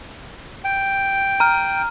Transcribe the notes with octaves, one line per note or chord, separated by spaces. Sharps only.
G5
A#5 F6